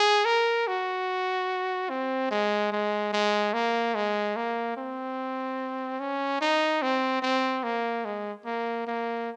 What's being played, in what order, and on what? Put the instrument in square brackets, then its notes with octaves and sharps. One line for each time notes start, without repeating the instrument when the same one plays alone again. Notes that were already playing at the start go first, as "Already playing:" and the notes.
Already playing: [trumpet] G#4
A#4
F#4
C4
G#3
G#3
G#3
A#3
G#3
A#3
C4
C#4
D#4
C4
C4
A#3
G#3
A#3
A#3